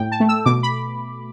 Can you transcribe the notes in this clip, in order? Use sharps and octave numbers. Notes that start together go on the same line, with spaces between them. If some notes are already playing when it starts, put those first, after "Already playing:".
Already playing: A2 A3 G5
A5
A3
E6
B2 D6
B5